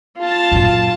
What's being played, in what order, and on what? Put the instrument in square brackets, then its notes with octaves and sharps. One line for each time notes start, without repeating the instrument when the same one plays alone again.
[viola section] F4 A5
[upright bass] F#2 A#2